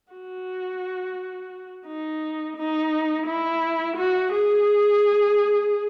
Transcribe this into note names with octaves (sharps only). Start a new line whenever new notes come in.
F#4
D#4
D#4
E4
F#4
G#4